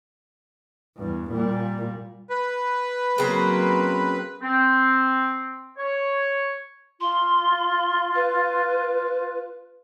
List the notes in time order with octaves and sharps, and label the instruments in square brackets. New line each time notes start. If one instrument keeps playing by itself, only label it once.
[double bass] E2 G2
A#2 G3
[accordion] B4
[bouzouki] C#3 C4 [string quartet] F#3 A#3
[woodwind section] C4
C#5
[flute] F4 [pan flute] C6
[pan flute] B4